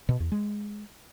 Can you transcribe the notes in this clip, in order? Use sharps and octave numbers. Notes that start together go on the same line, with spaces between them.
B2
E2
G#3